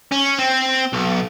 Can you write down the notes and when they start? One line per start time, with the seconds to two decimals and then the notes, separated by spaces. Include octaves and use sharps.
0.12 C#4
0.39 C4
0.93 B1